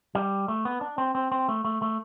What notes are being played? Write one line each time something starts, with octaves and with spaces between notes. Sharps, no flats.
G3
A3
B3
D4
C4
C4
C4
A3
A3
A3